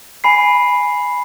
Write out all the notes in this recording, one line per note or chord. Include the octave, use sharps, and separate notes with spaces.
G#5 B5 C7